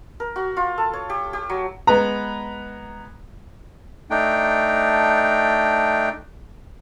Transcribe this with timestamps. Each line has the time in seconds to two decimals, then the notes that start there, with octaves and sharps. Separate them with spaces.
0.20 A#4
0.36 F#4
0.57 F4
0.78 A4
0.93 C#5
1.10 G4
1.33 G4
1.50 F#3
1.87 G#3 B3 B4 A#5
4.10 A3 D4 D#4 G5